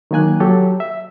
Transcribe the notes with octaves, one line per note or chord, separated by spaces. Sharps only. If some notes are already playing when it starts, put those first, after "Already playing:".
D#3 F#3 A#3 G#5 F#6
F#3 G4 A4
E5